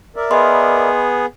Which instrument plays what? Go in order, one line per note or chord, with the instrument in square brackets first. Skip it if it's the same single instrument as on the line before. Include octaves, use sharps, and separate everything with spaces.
[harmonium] A#4 D5 E5
[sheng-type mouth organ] B3 G#4 [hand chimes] D#5 B5 C6